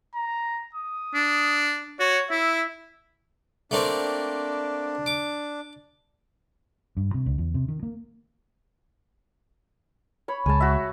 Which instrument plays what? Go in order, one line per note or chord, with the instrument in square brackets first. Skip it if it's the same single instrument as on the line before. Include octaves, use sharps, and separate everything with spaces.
[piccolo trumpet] A#5
D#6
[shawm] D4
[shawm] F#4 [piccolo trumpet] C#5
[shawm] E4 [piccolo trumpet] E5
[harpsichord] A3 A#3 C4 [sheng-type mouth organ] D4
[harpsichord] D6
[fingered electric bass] G2
C3
C#2
E2
C3
D#3
A#3
[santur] C#5 B5
[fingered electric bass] C#2 G#3 [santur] G#5 A5
[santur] F#4 E5